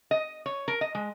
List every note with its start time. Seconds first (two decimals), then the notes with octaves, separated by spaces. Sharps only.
0.11 D#5
0.46 C#5
0.68 A#4
0.81 D#5
0.95 G#3